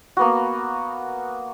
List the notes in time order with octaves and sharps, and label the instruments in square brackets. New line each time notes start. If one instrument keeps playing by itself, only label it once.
[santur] A#3 B3 F#4